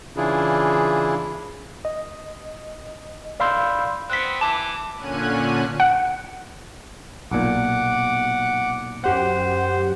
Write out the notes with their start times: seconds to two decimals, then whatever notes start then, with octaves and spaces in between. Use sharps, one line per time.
0.17 C#3 E3 D4 E4 F4 G#4
1.85 D#5
3.40 D5 F5 B5 C6 E6 G6
4.10 B3 C4 F#6 B6
4.41 E3 A5 D6
4.95 A#2 D3 C#4 G#5 F#6 D#7
5.80 F#5
7.31 B1 A#2 F#5 D6
9.04 F#2 G4 C5 F#5